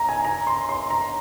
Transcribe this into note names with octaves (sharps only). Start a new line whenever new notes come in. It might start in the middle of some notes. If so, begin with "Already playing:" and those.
Already playing: A#5
G#5
A#5
C6
C6
A#5